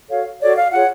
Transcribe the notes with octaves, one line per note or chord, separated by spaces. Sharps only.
F#4 A4 C#5 F5
F#4 A4 C#5 D5
F5
F4 G#4 C#5 F#5